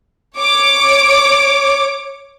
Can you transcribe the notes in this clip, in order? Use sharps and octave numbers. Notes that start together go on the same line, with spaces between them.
C#5 D6